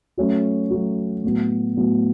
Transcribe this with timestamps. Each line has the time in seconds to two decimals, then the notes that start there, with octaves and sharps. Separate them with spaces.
0.17 F#3 A3 C#4 F#4
0.70 F#3 A3 C#4 F#4
1.23 A2 F#3 B3
1.76 A2 F#3 B3